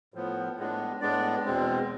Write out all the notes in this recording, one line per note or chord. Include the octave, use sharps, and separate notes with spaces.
A2 F3 B3
A2 G#3 B3 D4
A2 G#3 B3 D4 D5
E2 B2 G#3 C4